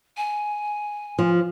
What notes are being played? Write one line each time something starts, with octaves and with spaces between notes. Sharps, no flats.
G#5
F3